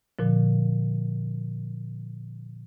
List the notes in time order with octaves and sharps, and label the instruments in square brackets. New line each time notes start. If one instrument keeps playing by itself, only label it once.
[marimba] A#2 D3 F3